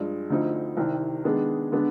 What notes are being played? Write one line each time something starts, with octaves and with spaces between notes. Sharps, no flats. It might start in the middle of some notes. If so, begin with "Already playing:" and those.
Already playing: G2 F3 G#3
D2 D3 F3 C4 D#4
C2 C3 D#3
D#3 G#3 B3 D4 G#4
D3 G#3 B3 D4